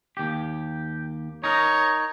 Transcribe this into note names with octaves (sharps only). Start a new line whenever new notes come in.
D#2 G4
D#4 A#4 C#5